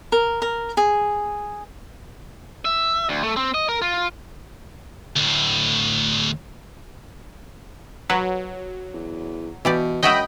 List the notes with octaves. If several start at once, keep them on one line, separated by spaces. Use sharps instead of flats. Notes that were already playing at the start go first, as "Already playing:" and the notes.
A#4
A#4
G#4
E5
D2
A3
C4
D#5
A#4
F4
D2 A2
F#3 B4
E2
B2 E3 G4 D5
F#2 G#3 F#4 D#5 E5 G5 B5